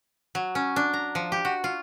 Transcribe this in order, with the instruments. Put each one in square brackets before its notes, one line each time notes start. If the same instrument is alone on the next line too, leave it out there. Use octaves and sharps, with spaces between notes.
[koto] F#3
C#4
D4
A#5
F3
G4
F#4
F4